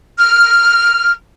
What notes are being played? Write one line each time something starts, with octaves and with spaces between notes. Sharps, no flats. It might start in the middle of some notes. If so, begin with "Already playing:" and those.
F6